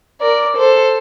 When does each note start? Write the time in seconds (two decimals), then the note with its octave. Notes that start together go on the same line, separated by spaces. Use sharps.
0.21 A#4 D5
0.57 A4 C5